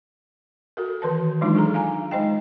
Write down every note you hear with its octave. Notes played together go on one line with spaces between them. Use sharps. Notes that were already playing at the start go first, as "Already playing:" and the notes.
F#4 A4 A#4
D#3 E3 A#4 B4 A5
E3 F#3 G#3 D4 D#4 F4
F4 G#4 A4 A#5
F5 G#5 A#5
G#3 D#4 C5 D#5 G5